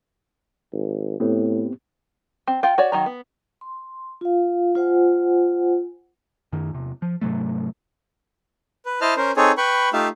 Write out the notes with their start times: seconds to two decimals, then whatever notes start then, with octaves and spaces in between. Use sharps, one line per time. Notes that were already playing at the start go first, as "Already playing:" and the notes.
0.72 G#1
1.20 A2 B3 C4 G4
2.48 C4
2.63 F4 G5
2.78 F#4 C#5 D5
2.92 D#3 F#3 A#5
3.06 B3
3.61 C6
4.21 F4 F5
4.75 F4 C5 F#5 G#5
6.52 F#2 D#3
6.73 E2 C3
7.02 F3
7.22 G#2 C3 F#3 A3
8.85 B4
9.01 E4 C5 D#5 A5 F6
9.17 C#4 A#4 C5
9.36 C4 D#4 G#4 A4 C#5
9.57 B4 G5 B5 C#6
9.93 A3 D#4 F4 G4 E5 F5